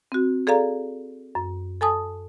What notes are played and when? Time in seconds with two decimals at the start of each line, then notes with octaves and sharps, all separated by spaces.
0.12 C4 F#4
0.47 G#4 A4 D5 F5 A#5
1.35 F#2
1.81 A4 G#5 A5 D#6